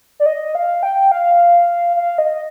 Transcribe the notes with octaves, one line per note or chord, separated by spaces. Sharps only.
D5
D#5
F5
G5
F5
F5
D#5